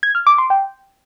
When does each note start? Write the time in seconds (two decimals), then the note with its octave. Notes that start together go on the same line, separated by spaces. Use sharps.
0.03 G#6
0.15 F6
0.27 D6
0.38 C6
0.50 G5